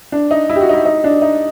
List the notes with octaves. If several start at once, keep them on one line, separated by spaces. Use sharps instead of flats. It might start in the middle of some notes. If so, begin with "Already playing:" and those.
D4
D#4
E4
G4
F#4
D#4
E4
D#4
D4
D#4